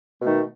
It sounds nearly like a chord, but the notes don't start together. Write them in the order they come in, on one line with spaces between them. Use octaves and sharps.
B2 A3 D#3